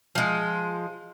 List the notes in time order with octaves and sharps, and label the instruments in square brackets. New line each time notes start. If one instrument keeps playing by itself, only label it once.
[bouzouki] F3 G#3